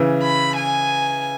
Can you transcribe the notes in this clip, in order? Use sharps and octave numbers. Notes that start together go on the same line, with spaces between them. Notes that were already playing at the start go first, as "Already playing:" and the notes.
Already playing: C#3 E3
B5
G#5